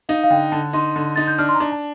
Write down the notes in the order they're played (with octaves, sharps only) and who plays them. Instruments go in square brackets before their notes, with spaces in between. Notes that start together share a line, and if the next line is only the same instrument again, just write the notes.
[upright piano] D#4 [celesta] F5
[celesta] F5
[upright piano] D3 [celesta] G5
[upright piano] D3 [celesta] A5
[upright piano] D#4 [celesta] C6
[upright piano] D3
[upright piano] D#4 [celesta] A6
[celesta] G6
[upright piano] D4 [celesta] F6
[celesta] C6
A#5
[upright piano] D4
[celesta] A5